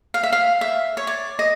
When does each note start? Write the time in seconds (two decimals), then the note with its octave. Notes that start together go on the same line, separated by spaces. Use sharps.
0.14 F5
0.23 E5
0.32 F5
0.61 E5
0.97 C#5
1.07 D5
1.39 D#5